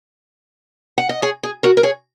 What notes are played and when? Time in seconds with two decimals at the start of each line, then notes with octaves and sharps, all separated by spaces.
0.98 F#5
1.09 D#5
1.22 G#4 C#5
1.43 G#4
1.63 F#4 A#4
1.77 A#4
1.83 G#4 C#5